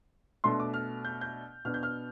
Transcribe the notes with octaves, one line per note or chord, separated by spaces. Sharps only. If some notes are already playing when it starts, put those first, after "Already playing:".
B2 A3 D4 C6
D6
F6
G6
G6
B2 B3 D4 F6
G6
F6